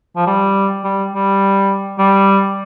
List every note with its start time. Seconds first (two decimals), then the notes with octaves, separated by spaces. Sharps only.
0.16 F3
0.27 G3
0.84 G3
1.12 G3
1.98 G3